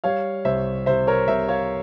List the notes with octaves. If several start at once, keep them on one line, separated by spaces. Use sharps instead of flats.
G3 C#5 F5
C2 C5 E5
C3 C5 E5
A#4 C#5
C2 C5 E5
C#5 F5